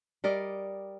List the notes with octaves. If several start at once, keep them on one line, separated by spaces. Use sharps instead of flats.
G3 A#4 D5 D#5